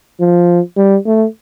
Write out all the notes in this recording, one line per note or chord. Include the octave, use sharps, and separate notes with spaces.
F3
G3
A3